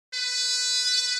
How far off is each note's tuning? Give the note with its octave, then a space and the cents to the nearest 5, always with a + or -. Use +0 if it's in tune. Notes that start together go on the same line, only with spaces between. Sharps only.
B4 +10